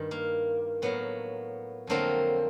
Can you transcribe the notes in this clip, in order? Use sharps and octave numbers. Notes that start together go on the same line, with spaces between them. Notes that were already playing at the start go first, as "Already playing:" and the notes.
Already playing: G2 D#3
A#3
A2 F#3 A#3 B3
F2 D3 F#3 A3 A#3 C4